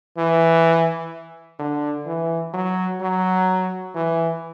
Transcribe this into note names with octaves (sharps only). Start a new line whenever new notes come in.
E3
D3
E3
F#3
F#3
E3